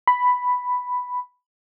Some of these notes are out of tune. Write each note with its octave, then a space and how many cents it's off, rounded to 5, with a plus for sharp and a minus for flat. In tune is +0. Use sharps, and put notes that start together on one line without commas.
B5 +5